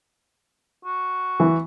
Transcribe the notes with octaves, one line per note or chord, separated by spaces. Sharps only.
F#4
E3